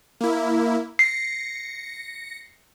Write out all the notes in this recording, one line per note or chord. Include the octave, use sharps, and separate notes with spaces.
A#3 E4
A#6 C7 C#7